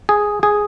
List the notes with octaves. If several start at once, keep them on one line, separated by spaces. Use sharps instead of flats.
G#4
G#4